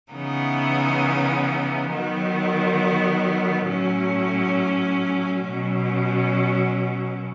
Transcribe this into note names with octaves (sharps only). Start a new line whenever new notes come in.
C#3 E3 B3 D#4
D#3 F#3 B3
A2 F#3 C#4
B2 F#3 C#4